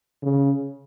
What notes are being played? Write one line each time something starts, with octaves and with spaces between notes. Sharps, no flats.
C#3